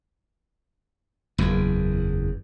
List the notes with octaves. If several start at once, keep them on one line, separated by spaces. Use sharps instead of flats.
F#1 E2